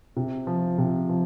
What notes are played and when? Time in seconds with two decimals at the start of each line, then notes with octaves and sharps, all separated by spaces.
0.16 C3
0.47 F3
0.78 C3
1.09 F3